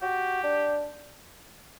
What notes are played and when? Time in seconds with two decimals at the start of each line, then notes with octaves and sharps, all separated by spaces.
0.02 F#4 G4
0.43 D4